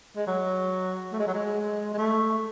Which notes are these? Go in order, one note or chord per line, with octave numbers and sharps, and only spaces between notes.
G#3
F#3
A3
G#3
F#3
G#3
G#3
A3